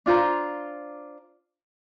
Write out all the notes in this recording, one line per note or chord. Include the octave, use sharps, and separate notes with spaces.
D4 F4 C5 A#5